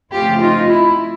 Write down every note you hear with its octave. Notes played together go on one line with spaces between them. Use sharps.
C#3 F3 A3 C4 F4 G4
D#4 F4
E4